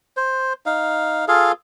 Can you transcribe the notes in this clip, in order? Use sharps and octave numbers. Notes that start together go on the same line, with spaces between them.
C5
D#4 F5
F4 G#4 A4 F5